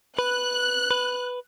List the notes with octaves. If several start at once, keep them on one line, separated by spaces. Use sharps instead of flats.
B4 F#6
B4